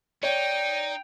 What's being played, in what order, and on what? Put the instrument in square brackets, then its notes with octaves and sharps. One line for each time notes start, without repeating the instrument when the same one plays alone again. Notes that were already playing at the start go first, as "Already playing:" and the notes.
[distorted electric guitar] D#4 [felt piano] C#5 [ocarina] D5 [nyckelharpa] G5